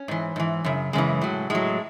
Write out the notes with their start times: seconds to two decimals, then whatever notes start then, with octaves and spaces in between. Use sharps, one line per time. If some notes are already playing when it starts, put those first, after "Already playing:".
Already playing: C#4
0.08 G#2 E3
0.36 G#2 E3
0.65 F#2 C#3
0.93 F#2 C#3 E3 G#3
1.22 A2 F#3
1.50 A2 F#3 G#3